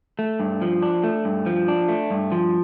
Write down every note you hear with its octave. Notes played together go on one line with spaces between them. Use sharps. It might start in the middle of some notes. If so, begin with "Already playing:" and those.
A3
G2
F3
D4
A3
G2
F3
D4
A3
G2
F3